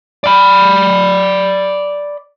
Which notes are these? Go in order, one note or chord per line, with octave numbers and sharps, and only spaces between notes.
D5 B5